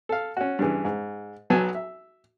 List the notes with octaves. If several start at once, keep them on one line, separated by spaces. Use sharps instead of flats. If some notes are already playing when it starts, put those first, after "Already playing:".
A4 F5
C#4 F#4
G2 C#3 E3
G#2
B1 F#3 B3 G#5 A5
E5